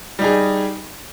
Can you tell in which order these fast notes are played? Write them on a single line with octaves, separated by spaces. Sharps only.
G3 D#4 G#4